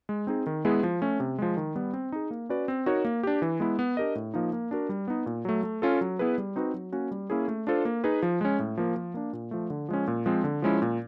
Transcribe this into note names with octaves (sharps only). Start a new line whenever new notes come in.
G#3
C4 D#4 G#4
D#3
G#3 B3 E4 G#4
F3
A3 C#4
C3
F3 G#3
D#3
G3 B3
C4
D#4 G#4
A#3
C#4 F#4 B4 D5
C4
D#4 F#4 A#4 C#5
A#3
D4 G4
E3
G#3 B3 E4
B3
D4 G4 A#4 D#5
A2
F3 A#3 D#4
A#3
D4 F#4 A#4
G3
B3 D#4
A#2
F#3 A3
A3
C#4 F4 A4
F#3
B3 E4 G#4 B4
G3
C4 D#4 F#4 B4
F#3
A#3 C#4 F#4
G3
A#3 C#4 E4 G#4
A3
D4 F4 A4 C5
A#3
D#4 G#4 B4
F3
G#3 C#4
A2
F3 A#3
F3
A#3 D4
A#2
F3 A3
D3
F3 G#3 C#4
A#2
F3 G#3 C4
D3
F3 G#3 C#4 E4
A#2